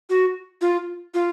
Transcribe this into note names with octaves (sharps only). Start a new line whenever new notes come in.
F#4
F4
F4